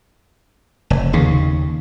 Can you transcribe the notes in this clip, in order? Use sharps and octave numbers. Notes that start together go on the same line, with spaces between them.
F1
D#2 C#3